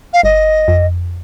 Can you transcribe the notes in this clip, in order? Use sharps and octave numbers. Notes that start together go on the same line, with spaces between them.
F5
G1 D#5
F2